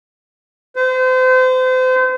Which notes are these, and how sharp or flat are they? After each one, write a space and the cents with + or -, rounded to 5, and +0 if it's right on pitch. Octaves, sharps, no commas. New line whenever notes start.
C5 -35